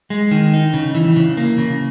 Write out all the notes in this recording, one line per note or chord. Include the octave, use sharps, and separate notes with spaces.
G#3
D#3
D#4
C#3
E3
C#3
A#3
C#3